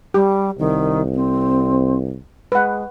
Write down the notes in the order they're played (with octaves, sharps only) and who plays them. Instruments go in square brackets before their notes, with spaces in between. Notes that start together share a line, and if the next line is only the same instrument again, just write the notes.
[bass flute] G3 [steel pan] G4
[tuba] C2 [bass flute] D#3
[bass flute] C4
[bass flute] G#3 [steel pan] B4 F#5